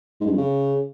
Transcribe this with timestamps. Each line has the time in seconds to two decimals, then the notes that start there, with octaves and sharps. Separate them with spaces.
0.21 G#2
0.26 G2
0.32 F2
0.37 C#3